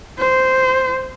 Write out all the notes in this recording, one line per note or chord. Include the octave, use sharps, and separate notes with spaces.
C5